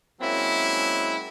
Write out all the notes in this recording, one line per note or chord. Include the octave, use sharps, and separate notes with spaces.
F#3 G#3 A#3 C4 C#4 E4